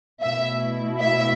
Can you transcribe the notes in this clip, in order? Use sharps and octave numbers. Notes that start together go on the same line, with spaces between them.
B2 A3 E4 E5
E5